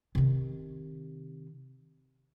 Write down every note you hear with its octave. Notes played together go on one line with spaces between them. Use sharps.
C3 D#3